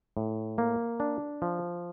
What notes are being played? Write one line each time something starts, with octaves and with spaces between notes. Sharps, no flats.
A2
A#3
D4
F3